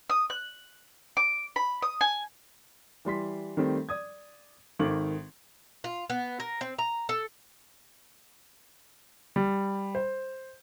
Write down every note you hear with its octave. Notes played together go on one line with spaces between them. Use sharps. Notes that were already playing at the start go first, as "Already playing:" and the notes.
D#6
F#6
D6
B5
D#6
G#5
E3 G3 C6 B6
D#3 G3 A3 C4
D5 D#6 G#6
G#1 D#3 A4 D6 F#7
F4
B3
A#4
C4
A#5
A4
G3
C5